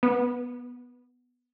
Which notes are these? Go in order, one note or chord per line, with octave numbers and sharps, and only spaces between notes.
B3